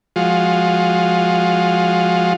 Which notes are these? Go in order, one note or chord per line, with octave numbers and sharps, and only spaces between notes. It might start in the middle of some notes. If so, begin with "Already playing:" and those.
F3 G#3 F4 F#4